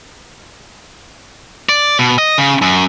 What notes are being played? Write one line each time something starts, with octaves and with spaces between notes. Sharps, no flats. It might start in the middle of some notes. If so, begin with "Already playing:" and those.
D5
B2
D#5
C#3
F#2